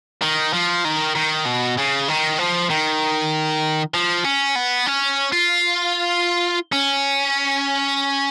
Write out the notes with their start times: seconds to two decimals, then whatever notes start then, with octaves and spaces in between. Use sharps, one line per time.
0.22 D#3
0.53 F3
0.85 D#3
1.16 D#3
1.45 B2
1.77 C#3
2.08 D#3
2.38 F3
2.70 D#3
3.94 F3
4.25 C#4
4.55 B3
4.86 C#4
5.32 F4
6.73 C#4